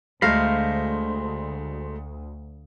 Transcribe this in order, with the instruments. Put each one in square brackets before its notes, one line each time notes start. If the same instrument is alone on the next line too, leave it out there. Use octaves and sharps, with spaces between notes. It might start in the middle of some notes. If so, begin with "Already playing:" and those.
[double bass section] D2 [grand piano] G#3 A3 [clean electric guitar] C5 A#5 B5 [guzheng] F5